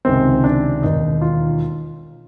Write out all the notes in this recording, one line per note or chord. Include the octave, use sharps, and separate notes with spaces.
C#2 C3 D#3 G#3 C4
D4
E1 D#2 D#3 D#4
F4